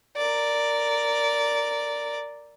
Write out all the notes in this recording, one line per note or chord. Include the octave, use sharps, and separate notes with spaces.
A#4 D5